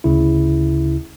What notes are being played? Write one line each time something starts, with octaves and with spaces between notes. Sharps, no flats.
D2 C#3 E4